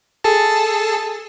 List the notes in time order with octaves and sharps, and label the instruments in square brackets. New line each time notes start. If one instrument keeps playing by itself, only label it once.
[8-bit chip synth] G#4 A4 A5